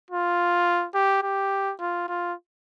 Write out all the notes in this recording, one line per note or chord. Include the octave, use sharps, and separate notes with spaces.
F4
G4
G4
F4
F4